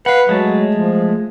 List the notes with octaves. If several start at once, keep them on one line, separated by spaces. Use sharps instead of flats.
B4 F5 F#5
F#3 G#3 A3 A5
F3